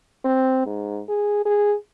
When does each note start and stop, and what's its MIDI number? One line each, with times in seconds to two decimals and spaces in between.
0.24 0.61 60
0.66 1.01 44
1.09 1.43 68
1.46 1.75 68